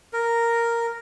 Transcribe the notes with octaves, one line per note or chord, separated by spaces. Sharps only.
A#4